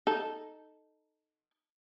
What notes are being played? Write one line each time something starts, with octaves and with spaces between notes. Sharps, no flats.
D#4 A4